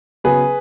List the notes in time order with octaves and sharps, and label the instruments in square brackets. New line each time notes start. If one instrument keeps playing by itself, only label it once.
[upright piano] C#3 F#3 B3 G#4 B4